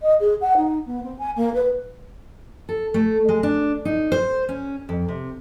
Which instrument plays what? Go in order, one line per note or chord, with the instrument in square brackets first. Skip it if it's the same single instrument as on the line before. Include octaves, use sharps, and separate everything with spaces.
[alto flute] D#5
G#4
F#5
D#4
B3
C4
G#5
A#3
B4
[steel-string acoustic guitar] A4
A3
G#3
D4
D#4
C5
C#4
F2
C3